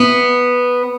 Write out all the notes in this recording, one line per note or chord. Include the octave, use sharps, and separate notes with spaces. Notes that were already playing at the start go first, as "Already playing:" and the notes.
Already playing: B3